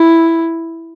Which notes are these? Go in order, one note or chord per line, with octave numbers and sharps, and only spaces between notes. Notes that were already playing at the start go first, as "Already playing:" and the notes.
Already playing: E4